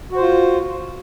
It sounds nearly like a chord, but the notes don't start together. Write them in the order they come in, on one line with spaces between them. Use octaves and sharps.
F#4 C5 F4